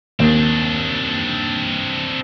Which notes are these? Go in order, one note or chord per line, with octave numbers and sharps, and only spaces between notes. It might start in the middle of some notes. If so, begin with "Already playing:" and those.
D#2 C4 D4